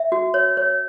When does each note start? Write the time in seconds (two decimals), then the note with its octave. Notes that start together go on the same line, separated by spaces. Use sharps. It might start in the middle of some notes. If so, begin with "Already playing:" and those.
Already playing: E5
0.12 F#4
0.34 C#5
0.57 C#5